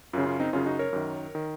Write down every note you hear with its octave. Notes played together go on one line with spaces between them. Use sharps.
F#2 C#3 C#4 F4
C#4 F4
C4 D#4
F#2 C#3 C#4 F4
D#4 F#4
A#4 C#5
F#2 D#3
D#3